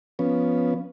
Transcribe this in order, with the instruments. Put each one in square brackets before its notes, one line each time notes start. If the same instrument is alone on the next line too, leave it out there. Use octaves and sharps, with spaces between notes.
[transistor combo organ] F3 B3 C#4